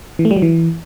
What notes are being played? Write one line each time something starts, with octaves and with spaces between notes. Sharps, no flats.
E3
A3
G3
F#3
E3